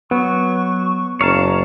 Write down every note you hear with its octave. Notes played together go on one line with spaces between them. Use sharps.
F#3 B3 C#6
F#1 C#5 F5 A5 A#5